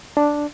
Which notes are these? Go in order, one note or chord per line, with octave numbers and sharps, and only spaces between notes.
D4